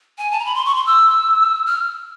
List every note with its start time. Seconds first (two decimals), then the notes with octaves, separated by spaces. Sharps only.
0.18 G#5
0.31 A5
0.39 A#5
0.45 B5
0.55 C6
0.65 C#6
0.75 C6
0.86 E6
1.66 F6